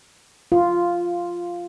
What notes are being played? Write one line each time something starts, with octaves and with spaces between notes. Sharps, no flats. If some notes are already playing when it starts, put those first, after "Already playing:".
F4